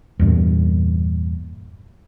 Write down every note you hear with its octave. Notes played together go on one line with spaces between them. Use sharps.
E2 G2 A#2